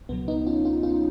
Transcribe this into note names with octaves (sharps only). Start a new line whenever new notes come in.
C#2 B2 F#3 B3
B3 D#4
C#4 F4
C#4 F4
C#4 F4